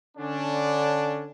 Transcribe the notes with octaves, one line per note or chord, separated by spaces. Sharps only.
D3 C#4 D4